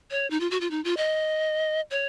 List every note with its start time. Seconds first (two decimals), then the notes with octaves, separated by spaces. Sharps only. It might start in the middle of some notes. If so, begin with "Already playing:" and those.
0.11 C#5
0.30 D#4
0.40 F4
0.51 F#4
0.61 F4
0.71 D#4
0.84 F4
0.97 D#5
1.91 C#5